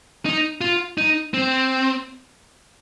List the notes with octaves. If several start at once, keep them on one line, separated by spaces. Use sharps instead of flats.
D#4
F4
D#4
C4